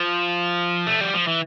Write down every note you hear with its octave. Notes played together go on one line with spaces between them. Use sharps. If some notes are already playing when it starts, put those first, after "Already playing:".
Already playing: F3
A3
G3
F3
E3